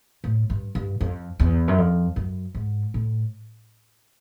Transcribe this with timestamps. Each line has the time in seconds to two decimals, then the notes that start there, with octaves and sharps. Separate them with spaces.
0.24 A2
0.50 G2
0.75 G2
1.01 F2
1.40 E2
1.68 F#2
1.78 F2
2.16 F#2
2.55 G#2
2.94 A2